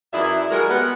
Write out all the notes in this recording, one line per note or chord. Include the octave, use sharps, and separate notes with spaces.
F#2 E3 E4 G#4 D5 E5
G3 G#3 F#4 A#4
B3